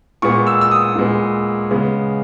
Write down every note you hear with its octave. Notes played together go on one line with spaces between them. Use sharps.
A#2 G#3 B3 C#6
E6
E6
D#6
A#2 G#3 B3
C#3 G#3 B3